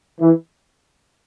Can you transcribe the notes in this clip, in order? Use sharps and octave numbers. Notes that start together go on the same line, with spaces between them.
E3